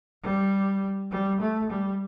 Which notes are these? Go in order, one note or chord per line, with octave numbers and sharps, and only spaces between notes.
G3
G3
A3
G3